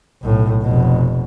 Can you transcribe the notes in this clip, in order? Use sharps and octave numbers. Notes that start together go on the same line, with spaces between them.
B1 A2
F1 B2